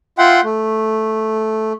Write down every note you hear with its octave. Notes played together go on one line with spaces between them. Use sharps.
F4 E5 F#5 G5 C6
A3